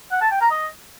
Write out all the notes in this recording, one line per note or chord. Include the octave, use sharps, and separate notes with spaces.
F#5
A5
G5
A#5
D#5